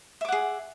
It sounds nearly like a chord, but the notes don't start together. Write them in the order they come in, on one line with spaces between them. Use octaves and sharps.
E5 D6 F#5 G#4